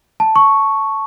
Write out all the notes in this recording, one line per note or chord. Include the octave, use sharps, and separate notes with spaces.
A5
C#6